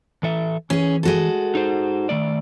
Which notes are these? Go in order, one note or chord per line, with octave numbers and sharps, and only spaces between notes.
E3 A4 E5
E3 C#4 G#4
G#3 F#4 A4
D#4 C5
D#3 A3 D5